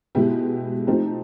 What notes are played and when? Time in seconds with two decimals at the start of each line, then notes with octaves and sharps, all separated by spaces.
0.15 B2 G#3 B3 E4 G4
0.87 F3 A3 C4 D#4 G4